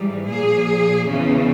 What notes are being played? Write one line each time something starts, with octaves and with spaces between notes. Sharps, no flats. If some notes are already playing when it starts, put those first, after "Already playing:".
Already playing: G#2 E3 G3
A#2 F3 G#4
E2 C#3 E3